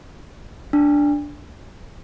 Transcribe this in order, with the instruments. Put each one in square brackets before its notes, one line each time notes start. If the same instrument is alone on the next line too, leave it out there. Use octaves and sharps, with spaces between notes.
[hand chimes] D4